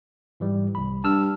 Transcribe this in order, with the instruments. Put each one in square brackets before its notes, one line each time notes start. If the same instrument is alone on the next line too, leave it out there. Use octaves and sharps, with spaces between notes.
[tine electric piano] G#2 E3 G3
C2 B5
[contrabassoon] G2 [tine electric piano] A5 E6 F6